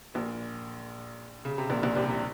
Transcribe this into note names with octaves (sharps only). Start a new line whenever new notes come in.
A#1 A#2
C#3
C3
A#1 A#2
A#1 A#2
C2 C3
C3